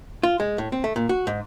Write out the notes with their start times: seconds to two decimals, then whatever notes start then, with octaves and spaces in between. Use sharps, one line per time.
0.23 F4
0.40 G#3
0.58 A2
0.72 C4
0.84 A3
0.96 A#2
1.09 F#4
1.27 G#2